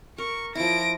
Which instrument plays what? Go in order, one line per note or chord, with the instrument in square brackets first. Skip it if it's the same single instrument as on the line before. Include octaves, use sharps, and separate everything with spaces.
[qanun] A#4 [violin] C#6
[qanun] F3 E4 [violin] A#6 D7